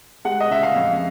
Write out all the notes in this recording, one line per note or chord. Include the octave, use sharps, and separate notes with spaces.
G#3 F#5
D#5
C#3 E5
F5
F2